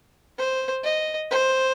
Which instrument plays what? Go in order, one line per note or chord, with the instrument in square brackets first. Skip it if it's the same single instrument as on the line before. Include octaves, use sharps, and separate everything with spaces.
[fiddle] C5
D#5
C5